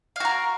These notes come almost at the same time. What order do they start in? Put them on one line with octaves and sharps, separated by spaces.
F5 F#4 A#4